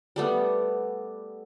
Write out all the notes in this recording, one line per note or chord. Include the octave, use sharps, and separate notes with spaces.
G3 A3 B3